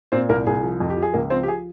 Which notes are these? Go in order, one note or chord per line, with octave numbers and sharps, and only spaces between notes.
A#2 C4 C5
C2 A#3 A#4
C2 G#4
F3
F2
G4
F3
G#4
C#2 A#3 A#4
F3 C4 C5
G4
G#4